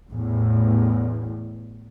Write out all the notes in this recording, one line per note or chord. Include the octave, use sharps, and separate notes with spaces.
A1 E2 A2